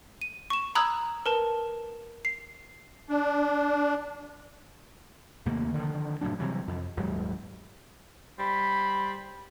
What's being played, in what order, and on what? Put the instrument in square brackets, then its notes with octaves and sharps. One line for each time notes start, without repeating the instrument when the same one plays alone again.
[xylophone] D#7
C#6 E7
A#5 B5 D#6 E6 F#6 G#6
A#4 B4 A5
C7
[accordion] D4
[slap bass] D#2 C3 A3 A#3
D3 D#3 F3
F1 A2 F#3 D4
C3 E3 F#3 G3
F2
D#1 D#2 G#2 F#3
[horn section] G3 C5 B5